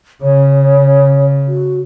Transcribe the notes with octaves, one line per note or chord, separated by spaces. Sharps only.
C#3 C#5
F#4